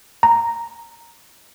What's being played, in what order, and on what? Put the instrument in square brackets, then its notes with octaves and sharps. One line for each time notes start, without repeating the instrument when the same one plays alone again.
[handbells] A#5